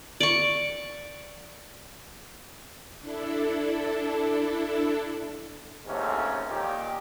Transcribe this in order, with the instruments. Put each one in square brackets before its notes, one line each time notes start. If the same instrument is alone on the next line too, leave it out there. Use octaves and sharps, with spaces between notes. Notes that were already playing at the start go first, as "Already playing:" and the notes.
[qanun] D5 C#6
[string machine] D4 E4 A4
[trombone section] A1 D#2 G#2 C3 A3 C#4
A#2 D#3 G4